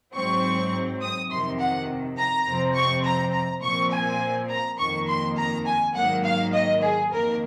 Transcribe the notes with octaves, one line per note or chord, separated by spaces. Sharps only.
G#2 F#3 C4 C#6
D#6
F2 C3 D#3 C6
F#5
A#5
F2 C3 F3 C4
C#6
A#5
A#5
A#2 F3 C4 C#6
G#5
A#5
F2 D#3 A#3 C#6
C6
A#5
G#5
G#2 D#3 F#3 A#3 F#5
F5
D#5
G#4
F2 D#3 A#3 A#4